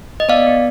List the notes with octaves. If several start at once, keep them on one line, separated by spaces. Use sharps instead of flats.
D#5
B3 D5 F5
B3